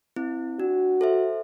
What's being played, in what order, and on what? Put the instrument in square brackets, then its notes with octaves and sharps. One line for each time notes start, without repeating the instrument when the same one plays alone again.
[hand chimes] C4 E4
[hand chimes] D4 [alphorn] F#4
[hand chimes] A4 C5 E5